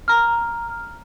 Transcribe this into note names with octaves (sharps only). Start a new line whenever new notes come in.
A#5 F6